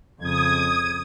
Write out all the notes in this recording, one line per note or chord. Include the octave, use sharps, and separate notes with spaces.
F2 C#3 D#6 G#6